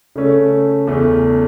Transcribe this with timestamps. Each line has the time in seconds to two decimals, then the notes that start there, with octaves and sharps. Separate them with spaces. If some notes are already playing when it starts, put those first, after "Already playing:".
0.15 C#3 A3 C#4 A4
0.87 E2 C#3 A3